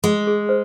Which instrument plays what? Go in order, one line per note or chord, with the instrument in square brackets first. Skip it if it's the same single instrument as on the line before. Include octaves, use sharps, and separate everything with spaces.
[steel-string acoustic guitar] G#3 [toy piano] G#4
[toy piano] G#4
C5